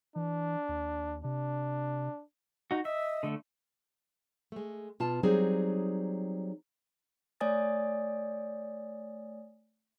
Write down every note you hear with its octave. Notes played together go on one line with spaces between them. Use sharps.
E3 D4
D#2
C3 D4
D#4 F#4
D#5 E5
D3 A3
G#3 A3
B2 F4 A5
F#3 G3 C4 D#4 G#4
A3 C#5 D5 G#5 D#6 A6